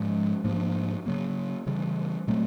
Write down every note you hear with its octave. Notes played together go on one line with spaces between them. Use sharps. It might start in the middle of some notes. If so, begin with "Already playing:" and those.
Already playing: G#2 F3 G#3
G#2 F3 A#3 D4
C#3 F#3 A#3
C#3 E3 G3
A#2 F#3 A3 C4